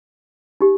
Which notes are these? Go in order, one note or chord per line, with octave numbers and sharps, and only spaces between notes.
D#4 G4